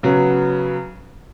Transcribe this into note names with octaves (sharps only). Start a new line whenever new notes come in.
C#3 F#3 B3